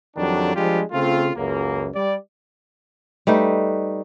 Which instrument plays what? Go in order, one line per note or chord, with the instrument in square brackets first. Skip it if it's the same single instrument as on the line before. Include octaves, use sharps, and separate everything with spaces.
[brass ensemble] F2 D#3 F#3 G3 D4
F3 G3 G#3 D4 F4 G4
C#3 A3 C4 F4
C#2 F#2 A#3
G3 D5
[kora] G3 A3 D#4 B4